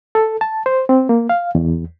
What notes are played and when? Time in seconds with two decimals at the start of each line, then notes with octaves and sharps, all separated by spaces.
0.15 A4
0.41 A5
0.66 C5
0.89 C4
1.09 A#3
1.29 F5
1.55 E2